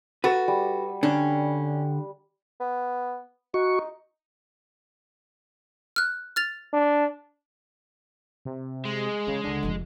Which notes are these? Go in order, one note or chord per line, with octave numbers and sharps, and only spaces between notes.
F#4 A4 B4
G3
D3 C#4 D4
B3
D#4 F#4 C#6
F6 F#6
F6 A6 F7
D4
C3
G#3
C#3 E3
C#2 D3
F1 F3